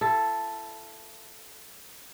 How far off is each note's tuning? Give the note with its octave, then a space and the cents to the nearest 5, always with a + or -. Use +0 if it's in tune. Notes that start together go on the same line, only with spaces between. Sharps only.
E4 +40 A4 +0